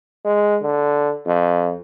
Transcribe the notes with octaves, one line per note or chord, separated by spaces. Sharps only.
G#3
D3
F2